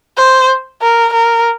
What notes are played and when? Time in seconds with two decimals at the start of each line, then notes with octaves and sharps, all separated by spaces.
0.18 C5
0.82 A#4
1.13 A#4